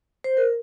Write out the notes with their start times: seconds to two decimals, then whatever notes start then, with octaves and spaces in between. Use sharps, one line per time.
0.24 C5
0.37 A#4